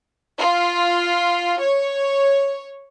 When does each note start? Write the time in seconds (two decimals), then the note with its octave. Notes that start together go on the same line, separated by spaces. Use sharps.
0.40 F4
1.61 C#5